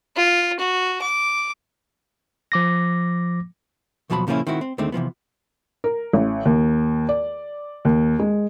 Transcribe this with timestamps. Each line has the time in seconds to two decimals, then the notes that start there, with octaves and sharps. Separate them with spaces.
0.16 F4
0.59 F#4
1.02 D6
2.52 F3 D6 A#6
4.10 D#2 B2 F3 F#3 A5 B5
4.27 A#2 C#3 F3 A#3 C#4 E4
4.47 D#3 C4 E4 F#4
4.61 C4
4.78 D#2 D3 D#3 G#3 A3 C4
4.92 C3 E3 F3 B3
5.84 A#4
6.13 A1
6.45 D#2
7.09 D5
7.85 D#2
8.19 G#3